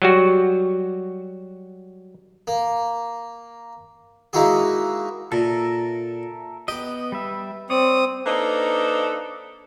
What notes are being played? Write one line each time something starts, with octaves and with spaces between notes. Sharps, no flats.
F#3 G3 F#4
A#3
G#3 A#3 D#4 E4 F#4 G#4
A#2 A4 A#4 E5
B3 G4 D#5
G3 B4 E5
C4 C#5 D5 D#6
A#3 D4 D#4 A4 B4 C5